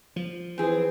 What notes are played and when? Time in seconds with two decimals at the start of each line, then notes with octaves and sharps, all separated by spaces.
0.16 F3
0.58 E3 C4 G#4